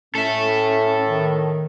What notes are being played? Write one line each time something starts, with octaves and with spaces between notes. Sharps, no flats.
A2 C#4 A4 E5
D#3